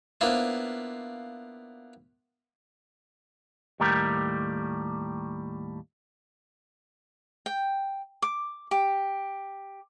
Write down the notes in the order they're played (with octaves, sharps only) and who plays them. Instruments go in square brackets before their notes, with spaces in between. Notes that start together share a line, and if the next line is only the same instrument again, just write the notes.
[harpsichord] A#3 B3 D4 E4 F4 C5
[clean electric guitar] D#2 A2 G3 A3 G4 A#4
[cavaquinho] G5
D6
G4